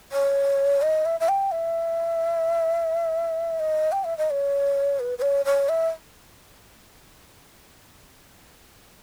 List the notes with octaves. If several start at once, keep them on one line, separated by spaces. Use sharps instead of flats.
C#5
D#5
E5
E5
G5
E5
D#5
G5
E5
D#5
C#5
B4
B4
C#5
C#5
E5